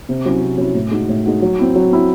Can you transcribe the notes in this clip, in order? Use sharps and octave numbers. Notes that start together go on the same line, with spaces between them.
C3
F#3 C#4 E4
C3
F#3 C#4 E4
A2
G#3 D#4 F#4
A2
G#3 D#4 F#4
F#3
C4 E4
F#3
C4 E4